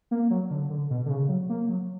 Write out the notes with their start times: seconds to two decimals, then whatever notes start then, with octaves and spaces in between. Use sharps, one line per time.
0.11 A#3
0.30 F#3
0.50 D3
0.70 D3
0.90 B2
1.06 D3
1.10 C#3
1.29 F#3
1.49 A#3
1.69 F#3